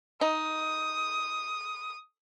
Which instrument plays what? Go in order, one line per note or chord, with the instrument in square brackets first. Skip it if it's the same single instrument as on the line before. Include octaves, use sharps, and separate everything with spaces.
[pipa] D#4 [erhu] D#6